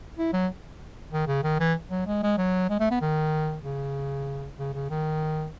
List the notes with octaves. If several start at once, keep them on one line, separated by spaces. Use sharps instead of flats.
E4
F#3
D#3
C#3
D#3
E3
F#3
G#3
G#3
F#3
G#3
A3
B3
D#3
C#3
C#3
C#3
D#3